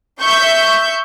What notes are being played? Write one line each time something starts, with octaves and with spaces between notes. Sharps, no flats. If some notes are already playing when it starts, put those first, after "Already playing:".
E5 C#6 G6